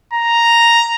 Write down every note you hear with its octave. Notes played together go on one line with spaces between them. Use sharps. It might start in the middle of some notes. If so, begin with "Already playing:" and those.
A#5